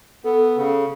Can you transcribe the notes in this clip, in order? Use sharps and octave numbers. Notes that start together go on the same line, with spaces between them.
B3 A4
C#3